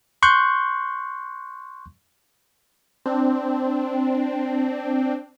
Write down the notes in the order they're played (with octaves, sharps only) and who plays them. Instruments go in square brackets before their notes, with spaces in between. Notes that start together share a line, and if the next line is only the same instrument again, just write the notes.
[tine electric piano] C6 C#6 F#6 G6
[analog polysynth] C4 D4